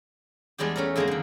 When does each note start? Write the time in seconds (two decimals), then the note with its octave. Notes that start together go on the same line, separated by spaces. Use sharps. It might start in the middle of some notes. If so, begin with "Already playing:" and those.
0.58 E2 G3 G#3 D4 G4
0.76 A3 C#4 A4 A#4
0.96 F2 D3 G#3 A#3 D#4 A#5
1.07 D3 D#3